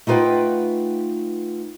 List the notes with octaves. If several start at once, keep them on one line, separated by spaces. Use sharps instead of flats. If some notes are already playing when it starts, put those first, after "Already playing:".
A3 D#4 F4 B4 F#5 G5